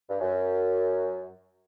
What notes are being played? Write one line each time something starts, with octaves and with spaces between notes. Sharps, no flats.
G2
F#2